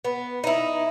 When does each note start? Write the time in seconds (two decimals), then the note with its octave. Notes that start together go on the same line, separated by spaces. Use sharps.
0.05 B3
0.44 D#4 E4